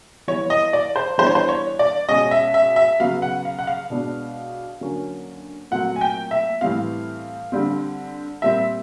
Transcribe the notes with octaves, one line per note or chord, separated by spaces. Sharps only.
E3 G3 B3 C#5
D#5
D5
C5
E3 G3 B3 D4 C5
C#5
C5
C#5
D5
B2 G#3 C#4 D#5
E5
E5
E5
C#3 F#3 B3 F5
F#5
F5
F#5
F5
B2 G#3 B3 D4
D3 F#3 A#3 C#4
A#2 F#3 A3 C4 F#5
G#5
G5
E5
A2 E3 G3 C4 F5
D3 G3 C4
A#2 G3 C4 E5